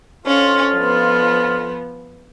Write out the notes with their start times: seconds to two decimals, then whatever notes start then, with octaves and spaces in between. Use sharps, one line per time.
0.25 F2 D3 C#4 F4
0.73 F3 B3